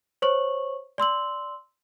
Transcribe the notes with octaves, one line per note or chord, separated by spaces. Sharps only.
C5 C#5 C#6 F#7
D5 C6 E6 F#7